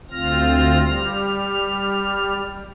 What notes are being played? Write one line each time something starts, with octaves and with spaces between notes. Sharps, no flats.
D2 C4 F4 F6 A#6
G3 F6